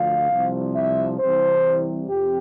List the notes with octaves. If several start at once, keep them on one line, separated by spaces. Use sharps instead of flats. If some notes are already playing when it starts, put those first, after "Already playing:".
Already playing: D2 D3 F3 F5
C2 C3 F3
E5
C2 C3 E3 C5
F2 C3 G4